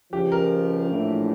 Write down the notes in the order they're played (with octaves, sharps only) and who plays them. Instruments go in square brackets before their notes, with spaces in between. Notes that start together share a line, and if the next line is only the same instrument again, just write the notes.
[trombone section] C#2 C#3 F3 [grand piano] G4
[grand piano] A#4
[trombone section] A#1 A2 E3